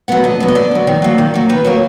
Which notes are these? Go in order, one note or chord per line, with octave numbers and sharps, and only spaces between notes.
F#3 B3 F#5
D3 D#5
F#3 B3
D#5
D3 D5
F#3 B3
D#3
F#3 A#3
D#3
F#3 A#3
D#3 B4
F#3 A#3 A#4